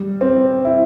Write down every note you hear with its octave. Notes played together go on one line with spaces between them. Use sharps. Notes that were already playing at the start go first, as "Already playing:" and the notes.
Already playing: G3
C4
E4